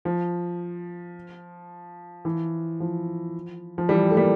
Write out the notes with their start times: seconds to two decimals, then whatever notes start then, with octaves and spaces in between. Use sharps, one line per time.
0.05 F3
2.25 E3
2.80 F3
3.78 F3
3.89 E3 G3
4.11 A3
4.17 G3 A#3